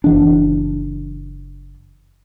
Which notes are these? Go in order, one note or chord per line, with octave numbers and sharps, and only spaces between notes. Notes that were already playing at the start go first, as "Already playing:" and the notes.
F#1 E3 D4